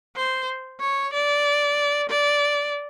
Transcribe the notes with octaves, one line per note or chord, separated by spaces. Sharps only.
C5
C#5
D5
D5